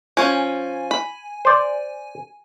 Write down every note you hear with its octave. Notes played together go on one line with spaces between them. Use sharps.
F3 C#4 G#5
B5
C5 D5